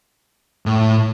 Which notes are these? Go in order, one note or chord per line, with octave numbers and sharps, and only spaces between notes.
A2